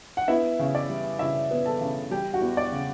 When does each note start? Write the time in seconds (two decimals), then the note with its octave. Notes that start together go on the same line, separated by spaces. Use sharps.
0.17 F#5
0.28 B3 E4 E5
0.59 C#3
0.75 D5
0.89 G3
1.19 C#3 E4 E5
1.51 B3
1.66 A4 A5
1.81 C#3
2.11 G3 G4 G5
2.34 F#4 F#5
2.41 E2
2.57 D5
2.72 C#3